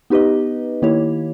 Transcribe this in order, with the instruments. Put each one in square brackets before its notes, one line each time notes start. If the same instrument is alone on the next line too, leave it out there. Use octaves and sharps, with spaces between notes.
[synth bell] B3 D#4 G4 B4 D#5
D#3 A#3 E4 G4 C#5